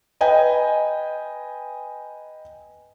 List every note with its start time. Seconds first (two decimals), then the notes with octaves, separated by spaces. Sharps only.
0.21 B4 D#5 G5 G#5 A#5